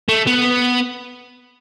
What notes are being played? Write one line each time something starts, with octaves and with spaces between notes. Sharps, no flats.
A3
B3